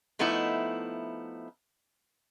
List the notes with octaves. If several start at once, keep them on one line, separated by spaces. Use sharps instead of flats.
F3 A3 B3 D#4 E4